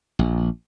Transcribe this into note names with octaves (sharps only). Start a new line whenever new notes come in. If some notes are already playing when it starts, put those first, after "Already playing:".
A#1